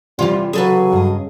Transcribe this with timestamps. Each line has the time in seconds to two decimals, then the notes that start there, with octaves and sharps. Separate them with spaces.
0.19 E2 C3 E3 G3 F4
0.53 C#3 F#3 G#4 A4 B4
0.93 G2 D#5